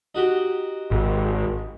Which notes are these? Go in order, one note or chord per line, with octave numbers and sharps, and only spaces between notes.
D#4 F#4 G4
G#1